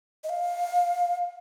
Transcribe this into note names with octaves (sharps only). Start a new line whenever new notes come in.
D#5
F5